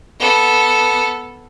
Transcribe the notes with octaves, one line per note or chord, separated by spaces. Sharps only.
B3 A4